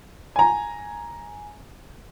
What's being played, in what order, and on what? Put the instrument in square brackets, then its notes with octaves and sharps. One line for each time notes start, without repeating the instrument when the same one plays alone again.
[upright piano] G#5 A#5